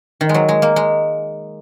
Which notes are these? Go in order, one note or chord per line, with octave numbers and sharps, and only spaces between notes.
D#3
G#3
F#3
G#3
A#3
G#3